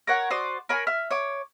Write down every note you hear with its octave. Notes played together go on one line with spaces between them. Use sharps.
A#4 C#5 F#5
F#4 C5 D5 D#6
A#4 C#5 G#5 B5
E5 F6
C#5 D6